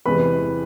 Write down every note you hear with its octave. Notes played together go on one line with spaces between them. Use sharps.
E2 C3 E3 G#3 B4 B5